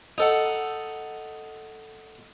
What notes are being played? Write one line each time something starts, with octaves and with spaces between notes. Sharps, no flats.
D#4 A4 F#5